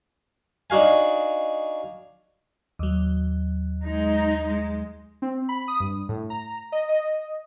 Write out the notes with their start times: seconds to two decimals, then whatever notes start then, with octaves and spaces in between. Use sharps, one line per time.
0.70 D4 D#4 F#4 F5 G#5
2.79 D#2 F#3
3.82 G#3 D#4
4.46 G#3
5.22 C4
5.49 B5
5.68 D#6
5.80 G2
6.09 A2
6.30 A#5
6.72 D#5
6.89 D#5